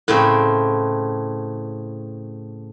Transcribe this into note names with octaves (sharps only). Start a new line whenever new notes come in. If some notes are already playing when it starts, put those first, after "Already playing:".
A2 C#3 C4